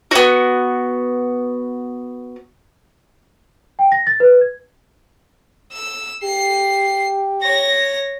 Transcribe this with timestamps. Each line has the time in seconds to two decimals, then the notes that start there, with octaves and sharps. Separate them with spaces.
0.11 B3 F#4
3.79 G5
3.92 A#6
4.07 A6
4.20 B4
4.41 G#6
5.72 E6
6.24 G4 C7
7.42 C#5 A#6